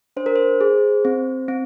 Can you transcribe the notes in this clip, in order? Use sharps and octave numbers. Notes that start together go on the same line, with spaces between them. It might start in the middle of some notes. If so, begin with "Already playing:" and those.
D4 C5
A#4
C5
G#4
C4
C4